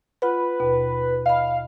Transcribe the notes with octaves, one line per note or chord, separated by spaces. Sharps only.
F4 B4 F#5 B5
D#2 B2
D#5 F5 B5